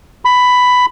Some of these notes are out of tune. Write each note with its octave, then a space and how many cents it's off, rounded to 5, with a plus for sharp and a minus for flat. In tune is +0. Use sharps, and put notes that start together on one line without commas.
B5 +10